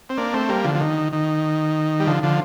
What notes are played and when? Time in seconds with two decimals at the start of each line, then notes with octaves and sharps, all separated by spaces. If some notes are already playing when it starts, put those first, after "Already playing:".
0.09 C4
0.17 A#3 D4
0.33 A3 C4
0.49 G3 A#3
0.64 D3 F3
0.75 F3
0.80 D#3
1.13 D#3
2.00 G3
2.07 D3 F3
2.23 D3 F3